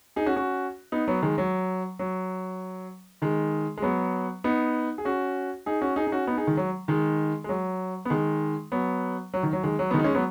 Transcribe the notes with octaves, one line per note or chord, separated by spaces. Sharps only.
D#4 G#4
C#4 F#4
C#4 F#4
B3 D#4
F#3 B3
D#3 G#3
F#3
F#3
D#3 G#3
G#3
F#3 B3
B3 D#4
G#4
C#4 F#4
D#4 G#4
C#4 F#4
D#4 G#4
D#4
C#4 F#4
B3 D#4
D#4 G#4
D#3 G#3
F#3
D#3 G#3
G#3
F#3
B3
D#3 G#3
F#3 B3
F#3
D#3
F#3
D#3 G#3
F#3
B3
D#3 G#3
D#4
G#3 C#4
F#3 B3